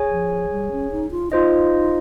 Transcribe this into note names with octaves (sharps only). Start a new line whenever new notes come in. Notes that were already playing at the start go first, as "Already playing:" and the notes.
Already playing: G#4 C#5 G#5
F3
G3
C#4
D#4
F4
D#4 F4 C5 D#5